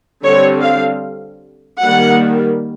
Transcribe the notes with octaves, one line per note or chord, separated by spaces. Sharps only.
D3 G3 C4 C#5
F5
D#3 G3 A#3 F#5